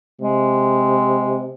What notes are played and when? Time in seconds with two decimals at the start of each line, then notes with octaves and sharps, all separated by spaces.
0.21 C3 G#3